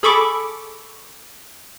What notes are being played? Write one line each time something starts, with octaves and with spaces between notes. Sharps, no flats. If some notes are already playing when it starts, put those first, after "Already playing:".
G#4 A4 B5 C#6 D6